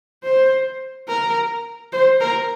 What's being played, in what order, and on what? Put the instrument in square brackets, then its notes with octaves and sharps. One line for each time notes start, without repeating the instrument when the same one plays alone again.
[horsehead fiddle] C5
A#4
C5
A#4